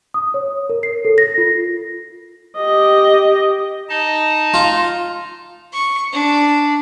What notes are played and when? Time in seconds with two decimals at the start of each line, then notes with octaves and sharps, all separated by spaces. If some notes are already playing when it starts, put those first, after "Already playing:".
0.14 D#6
0.34 C#5
0.70 A#4
0.83 C7
1.05 A4
1.18 A#6
1.38 F4
2.58 G4 D#5
3.89 D#4 D#5 A5
4.54 F4
5.73 C#6
6.13 D4